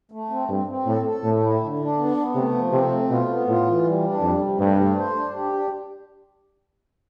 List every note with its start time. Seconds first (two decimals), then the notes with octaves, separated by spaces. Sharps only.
0.12 A3
0.30 C4
0.48 G2 C4
0.67 C4
0.86 A2 A4
1.05 A4
1.23 A2 A3
1.42 E4
1.60 D3
1.79 D4
1.98 B3
2.17 B3
2.35 C3 A3
2.54 F3
2.73 C3 C4
2.92 A3
3.10 B2 F4
3.29 B3
3.47 A2 F4
3.66 E3
3.84 G3
4.03 D4
4.21 F2 G3
4.40 C3
4.59 G2 A3
4.77 A3
4.97 C5
5.15 D4
5.34 G4
5.53 D4